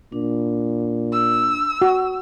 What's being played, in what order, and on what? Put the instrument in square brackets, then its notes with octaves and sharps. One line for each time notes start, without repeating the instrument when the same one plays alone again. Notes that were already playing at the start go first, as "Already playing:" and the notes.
[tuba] A#2 [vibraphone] D4
[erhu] E6
[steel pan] F#4